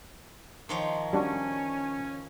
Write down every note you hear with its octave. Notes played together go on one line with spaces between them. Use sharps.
D#3 F3 C#5 C6
G3 C#4 D4 F#4